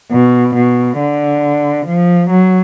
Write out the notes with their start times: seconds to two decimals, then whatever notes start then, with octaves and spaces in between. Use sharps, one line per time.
0.11 B2
0.55 B2
0.99 D3
1.87 F3
2.30 F#3